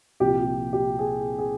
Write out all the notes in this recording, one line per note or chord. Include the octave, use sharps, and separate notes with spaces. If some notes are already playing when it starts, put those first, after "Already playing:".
C2 A#2 F3 G4
G4
G#4
G#4